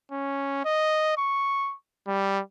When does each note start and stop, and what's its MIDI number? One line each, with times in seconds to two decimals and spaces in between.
0.12 0.62 61
0.65 1.13 75
1.17 1.75 85
2.07 2.41 55